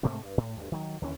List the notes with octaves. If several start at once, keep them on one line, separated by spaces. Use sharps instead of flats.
G#2 C3 A3 A#3
G2
A2
D2 G2
D#3 F#3
D#2 D3 E3 C#4